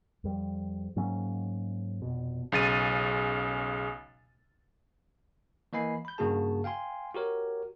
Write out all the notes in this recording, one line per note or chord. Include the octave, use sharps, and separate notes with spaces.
F2 G3
G#2 F#3 A#3 C#4
F1 B2
B1 C#3 A6 D#7
E3 A#3 D#5 G#5 B5 C7
B5 G6
G2 C#3 A#3 F#4 G#4 A5
F5 G5 G#5 C6
F#4 G4 A#4 C#5